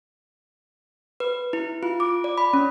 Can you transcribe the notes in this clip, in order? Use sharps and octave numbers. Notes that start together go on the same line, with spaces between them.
B4
E4
F4
D6
D5
B5
C#4